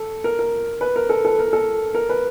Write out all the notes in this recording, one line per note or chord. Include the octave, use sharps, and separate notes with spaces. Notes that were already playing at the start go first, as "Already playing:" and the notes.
Already playing: A4
A#4
A#4
B4
A#4
A4
A4
A#4
A4
A#4
B4